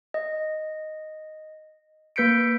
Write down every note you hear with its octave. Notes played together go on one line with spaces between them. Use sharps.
D#5
A#3 B4 G6 B6 C#7 D7